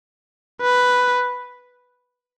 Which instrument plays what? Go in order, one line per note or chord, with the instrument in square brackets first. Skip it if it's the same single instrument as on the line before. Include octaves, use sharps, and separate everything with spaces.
[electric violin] B4